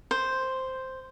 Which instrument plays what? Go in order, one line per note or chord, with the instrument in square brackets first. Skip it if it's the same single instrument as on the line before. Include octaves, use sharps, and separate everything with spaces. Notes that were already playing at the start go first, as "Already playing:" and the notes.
[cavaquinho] C5